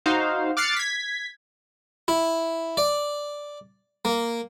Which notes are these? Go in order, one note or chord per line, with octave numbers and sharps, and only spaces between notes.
D#4 F#4 C5 F5
D6 F6 F#6 A6 C7 C#7
G#6 B6
E4
D5
A#3